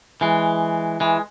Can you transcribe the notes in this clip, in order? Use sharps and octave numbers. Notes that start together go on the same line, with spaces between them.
E3 G#3
E3 G#3